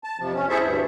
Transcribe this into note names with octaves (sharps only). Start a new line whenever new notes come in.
A5
F2 C3 F3
C#4
E4 G#4 A4 C5 E5
D2 G2